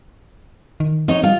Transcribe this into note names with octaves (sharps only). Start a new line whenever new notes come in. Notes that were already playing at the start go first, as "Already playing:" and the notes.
D#3
C4 D#4 C#5
G3 F4